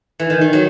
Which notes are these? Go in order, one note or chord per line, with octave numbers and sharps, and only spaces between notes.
E3
D#3
D#3
F#3